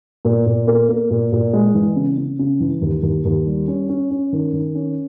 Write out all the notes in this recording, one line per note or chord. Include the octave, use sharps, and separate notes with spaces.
A#2
A#2
A#3
A#3
A#2
A#2
G#3
E3
C#3
C#3
C#3
E3
D#2
D#2
D#2
G3
C#4
C#4
C#4
D#3
D#3
C#4